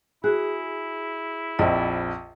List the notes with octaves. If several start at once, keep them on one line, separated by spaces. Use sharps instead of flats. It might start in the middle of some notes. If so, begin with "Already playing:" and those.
E4 F#4 G#4 F#6
A#1 F2 D#5 E5